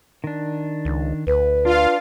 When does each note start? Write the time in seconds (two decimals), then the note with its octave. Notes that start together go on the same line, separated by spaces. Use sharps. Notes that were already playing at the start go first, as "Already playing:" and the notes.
0.24 D#3 D4
0.85 C#2
1.27 D2 B4
1.65 D4 F4 F5